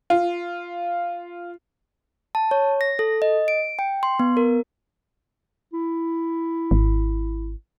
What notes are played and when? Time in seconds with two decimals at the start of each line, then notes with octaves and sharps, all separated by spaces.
0.10 F4
2.35 A5
2.51 C#5
2.81 A#6
2.99 A4
3.22 D#5
3.48 D7
3.79 G5
4.03 C6
4.19 B3
4.37 A#4
5.73 E4
6.71 G#1